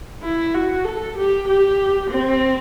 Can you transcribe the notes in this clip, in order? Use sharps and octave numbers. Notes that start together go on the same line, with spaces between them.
E4
F#4
A4
G4
G4
C4